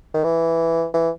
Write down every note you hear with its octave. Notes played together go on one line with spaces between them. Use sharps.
D#3
E3
E3